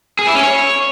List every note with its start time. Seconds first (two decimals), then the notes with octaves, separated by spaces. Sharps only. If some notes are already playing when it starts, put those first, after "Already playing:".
0.19 G#4
0.27 E4
0.35 C#4
0.43 C#5